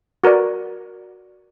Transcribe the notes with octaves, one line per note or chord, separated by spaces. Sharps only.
F#4 A#4 B4 D5